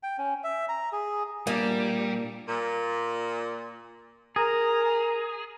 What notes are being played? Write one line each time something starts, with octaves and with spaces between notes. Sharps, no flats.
G5
C#4
E5
A#5
G#4
A#2 G3 A#3 D4
A#2
G#4 A#4 A#5